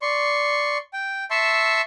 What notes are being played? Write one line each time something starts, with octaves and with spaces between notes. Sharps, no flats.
D5 C6 C#6
G5
E5 A5 C6 C#6 E6